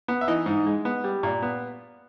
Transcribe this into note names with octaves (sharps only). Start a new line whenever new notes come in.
B3
E5
E3 D#4 D#5
G#2
G#3
B3
G3
A#2
B3